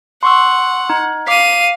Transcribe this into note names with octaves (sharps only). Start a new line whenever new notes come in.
F#5 C6 C#6 E6
D#4
F5 D6 B6 D#7